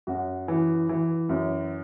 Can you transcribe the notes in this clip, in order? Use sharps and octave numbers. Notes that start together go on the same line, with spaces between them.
F#2 F#4
E3
E3
F#2